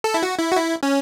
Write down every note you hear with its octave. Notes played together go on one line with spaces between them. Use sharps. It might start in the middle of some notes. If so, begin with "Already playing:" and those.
A4
E4
F#4
E4
F#4
E4
C#4